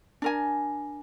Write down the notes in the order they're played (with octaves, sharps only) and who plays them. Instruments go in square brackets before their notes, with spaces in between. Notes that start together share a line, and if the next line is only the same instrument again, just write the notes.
[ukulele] D4 A#4 G#5